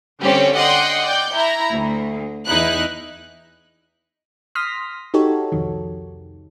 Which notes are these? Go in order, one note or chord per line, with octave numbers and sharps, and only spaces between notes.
D3 G3 C4 C#4 G4 C#5
D5 D#5 F#5 G5 C6
D5 G5 G6
E4 A#5
D2
E2 D#4 E4 F#6
C6 D#6 F6 A#6 B6
D#4 F#4 G4 A4 C#5
C2 F2 D#3